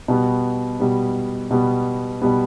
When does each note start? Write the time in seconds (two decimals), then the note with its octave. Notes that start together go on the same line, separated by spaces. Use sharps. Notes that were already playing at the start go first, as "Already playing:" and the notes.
0.08 B2 G3 B3
0.80 B2 G3 B3
1.51 B2 G3 B3
2.22 B2 G3 B3